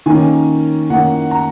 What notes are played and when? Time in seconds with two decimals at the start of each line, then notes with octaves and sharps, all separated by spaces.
0.06 D#3 A#3 C#4 G#5
0.90 D#3 A#3 C#4 F#5
1.31 A#5